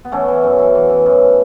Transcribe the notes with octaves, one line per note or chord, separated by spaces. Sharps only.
B3
E3 A3 C#4
E3
F#2
E3
E3
E3
F#2